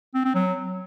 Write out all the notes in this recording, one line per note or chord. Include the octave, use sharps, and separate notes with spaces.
C4
C4
F#3